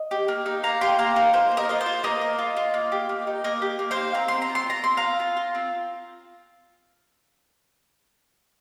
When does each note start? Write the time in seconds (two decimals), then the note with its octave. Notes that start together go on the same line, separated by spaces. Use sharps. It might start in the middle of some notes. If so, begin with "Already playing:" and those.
Already playing: D#5
0.11 G4
0.28 A#3
0.46 D#4
0.63 A#3 F5 A#5
0.81 G4 G5 C6
0.98 A#3 F5 A#5
1.16 D#4 A#4
1.33 A#3 C5
1.51 A#3
1.57 A#4 D#5
1.69 F4 D#5
1.81 C5
1.86 F4
2.04 A#3 A#4 D#5
2.21 A#3
2.39 F4
2.57 F4
2.74 A#3
2.92 G4
3.09 A#3
3.27 D#4
3.44 A#3 A#4 D#5
3.62 G4
3.79 A#3
3.91 C5 F5
3.97 D#4
4.14 C4 A#5
4.28 C4 C6
4.42 A#5
4.49 F4
4.55 C6
4.67 F4 A#5
4.84 C4 C6
4.97 C4 F5 A#5
5.20 F4
5.37 F4
5.55 C4